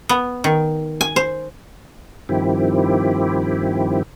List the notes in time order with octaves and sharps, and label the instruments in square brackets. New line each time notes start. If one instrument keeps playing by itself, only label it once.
[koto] B3
D#3
G#5
C5
[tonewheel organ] G2 D#3 F3 C4 E4 G4